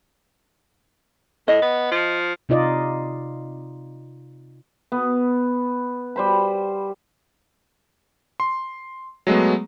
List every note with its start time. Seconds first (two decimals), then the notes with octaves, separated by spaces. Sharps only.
1.48 A2 D#5
1.62 B3
1.91 F3
2.49 C3 D#4 F4 D5 D#5
4.92 B3
6.16 G3 C5 B5
8.40 C6
9.27 F#3 G#3 A3 B3